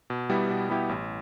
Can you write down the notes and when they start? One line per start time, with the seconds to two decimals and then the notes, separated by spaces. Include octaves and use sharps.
0.10 B2
0.30 G3 B3 E4 G4
0.50 B2
0.69 G3 B3 E4 G4
0.89 A1